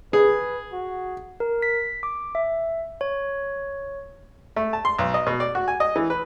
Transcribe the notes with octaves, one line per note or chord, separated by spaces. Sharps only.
G#4 B4
F#4
A#4
B6
D6
E5
C#5
A3
A5
C6
B1
D#5
B2
D5
F#4
G#5
D#5
E3
B4